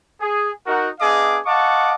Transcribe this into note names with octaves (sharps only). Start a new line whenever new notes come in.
G#4
D#4 F#4 A#4
B3 D4 G#4 D#5 F5 D6
D#5 F5 F#5 A5 C#6 D6